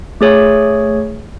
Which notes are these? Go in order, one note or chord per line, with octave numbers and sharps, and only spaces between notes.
A3 G#4 C#5